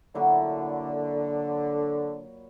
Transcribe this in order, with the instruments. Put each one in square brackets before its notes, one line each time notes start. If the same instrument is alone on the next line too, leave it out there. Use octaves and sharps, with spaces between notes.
[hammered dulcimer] A#2 F#3 E4 [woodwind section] D3